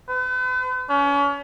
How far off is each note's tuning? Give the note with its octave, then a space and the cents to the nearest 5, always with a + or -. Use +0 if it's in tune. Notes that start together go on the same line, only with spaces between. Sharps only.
B4 +45
C#4 +35